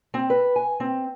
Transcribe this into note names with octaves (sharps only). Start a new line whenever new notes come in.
C4
B4
G#5
C4